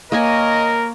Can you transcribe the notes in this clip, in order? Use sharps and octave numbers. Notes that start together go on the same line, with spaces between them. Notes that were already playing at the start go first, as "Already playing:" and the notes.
A#3 A#4 C#5 D#5 G#5